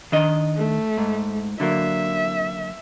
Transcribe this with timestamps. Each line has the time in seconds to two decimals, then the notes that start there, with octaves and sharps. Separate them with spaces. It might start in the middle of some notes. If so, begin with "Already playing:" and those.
0.12 D#3 D4 D#5
0.57 A3
0.98 G#2
1.60 D3 F#3 A#3 E5